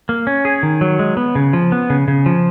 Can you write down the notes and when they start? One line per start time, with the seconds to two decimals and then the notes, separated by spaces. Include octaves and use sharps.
0.09 A#3
0.27 C#4
0.45 G#4
0.63 D#3
0.81 F#3
0.99 G#3
1.17 B3
1.35 C#3
1.53 F3
1.72 B3
1.90 C#3
2.08 C#3
2.26 F3